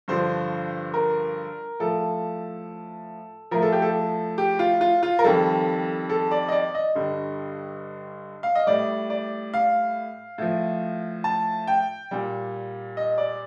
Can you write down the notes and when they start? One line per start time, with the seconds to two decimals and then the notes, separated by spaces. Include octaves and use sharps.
0.08 G2 D3 F3 C5
0.94 A#4
1.80 A2 F3 A4
3.51 A2 F3 A#4
3.62 A4
3.72 G4
3.82 A4
4.38 G4
4.59 F4
4.81 F4
5.03 F4
5.19 A#4
5.24 F2 D#3 G3 A4
6.10 A4
6.31 D5
6.48 D#5
6.52 D5
6.74 D#5
6.95 G2 D3 G3
8.43 F5
8.55 D#5
8.67 A2 G3 D5
9.10 D5
9.54 F5
10.38 A2 F3
11.24 A5
11.67 G5
12.11 A#2 G3
12.97 D#5
13.18 D5